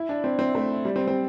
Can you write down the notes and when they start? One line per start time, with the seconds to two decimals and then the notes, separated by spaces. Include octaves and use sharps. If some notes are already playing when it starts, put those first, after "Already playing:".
Already playing: E4
0.09 D4
0.24 C4
0.39 C4
0.55 A3
0.85 G3
0.96 C4
1.08 C4